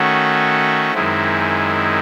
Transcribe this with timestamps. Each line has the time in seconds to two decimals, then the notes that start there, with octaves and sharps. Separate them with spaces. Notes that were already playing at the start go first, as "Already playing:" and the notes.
Already playing: D#3 A3 C#4 F#4
0.94 F#2 D#3 G#3 C4 E4